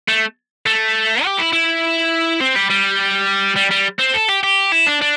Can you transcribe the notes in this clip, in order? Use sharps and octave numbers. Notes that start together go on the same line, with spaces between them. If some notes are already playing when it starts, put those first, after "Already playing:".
A3
A3
G4
E4
E4
C4
G3
G3
G3
G3
C4
A4
G4
G4
E4
D4
D4